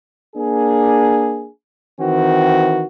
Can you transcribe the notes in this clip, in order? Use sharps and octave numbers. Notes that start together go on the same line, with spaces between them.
A#3 D4 G#4
D#3 E3 C4 F#4